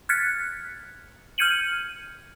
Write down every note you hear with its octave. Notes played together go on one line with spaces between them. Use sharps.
F6 F#6 G#6 A6 B6 C#7
F6 G6 G#6 C#7 D#7 F#7